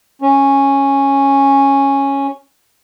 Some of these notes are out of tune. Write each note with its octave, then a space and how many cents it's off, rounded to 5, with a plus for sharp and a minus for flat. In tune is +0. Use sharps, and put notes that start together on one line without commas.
C#4 -5